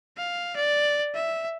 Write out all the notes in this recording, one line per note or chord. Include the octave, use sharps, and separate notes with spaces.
F5
D5
E5